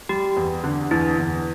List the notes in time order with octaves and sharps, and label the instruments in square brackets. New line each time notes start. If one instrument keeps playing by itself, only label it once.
[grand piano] G3 [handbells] G4
[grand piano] E2
D3
[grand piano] E2 [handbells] E4
[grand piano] E2